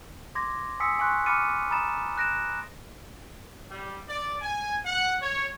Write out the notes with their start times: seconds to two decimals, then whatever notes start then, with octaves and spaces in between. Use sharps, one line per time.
0.35 C6 D6 G#6 A#6
0.80 G#5 C6 D#6 E6 B6 C#7
0.99 G#5 C6 C#6 F#6
1.26 B5 D6 F6 A6 C#7 D#7
1.71 A#5 B5 D#6 A6 E7
2.18 F#6 A#6 D7 E7
3.69 G3
4.07 D5
4.41 G#5
4.84 F#5
5.21 C#5